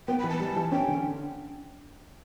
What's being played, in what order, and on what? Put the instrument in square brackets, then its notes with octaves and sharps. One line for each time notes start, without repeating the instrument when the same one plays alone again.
[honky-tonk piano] B3 [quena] G5
[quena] B5
[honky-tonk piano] E3
[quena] A5
[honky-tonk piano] G3
E3
[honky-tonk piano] C#4 [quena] G5
[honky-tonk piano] D3